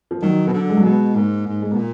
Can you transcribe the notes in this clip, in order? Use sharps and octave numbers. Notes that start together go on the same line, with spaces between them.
F3
D#3 F#3
B2
D3
G#3
F#3
B2 G#3
G#2 A#3
G#2
G#3
B2 A#3
A#2